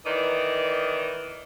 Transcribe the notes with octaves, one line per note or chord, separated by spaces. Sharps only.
D#3 E3 D5 D#5